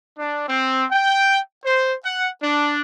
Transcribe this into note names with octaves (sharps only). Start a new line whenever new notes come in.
D4
C4
G5
C5
F#5
D4